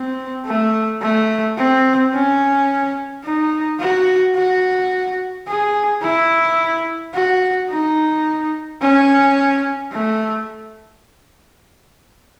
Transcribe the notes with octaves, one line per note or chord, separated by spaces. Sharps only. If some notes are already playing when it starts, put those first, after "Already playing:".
Already playing: C4
A3
A3
C4
C#4
D#4
F#4
F#4
G#4
E4
F#4
D#4
C#4
A3